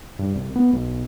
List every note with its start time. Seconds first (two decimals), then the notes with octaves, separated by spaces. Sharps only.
0.19 G2
0.35 C2
0.56 B3
0.73 B1